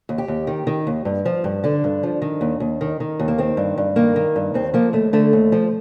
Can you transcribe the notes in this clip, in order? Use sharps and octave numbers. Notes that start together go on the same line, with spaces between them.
D#2
G4
D#2
D#3
D#3
D#2
G2
F3
G2
D3 D4
G2
F3
D#3
D#2
D#2
D#3
D#3
D#2
A#3
D#3 C4
G2
G2
D#3 A#3
D#3
G2
D#2 C4
F3 A#3
D#2 A3
D3 A3
D#2
F3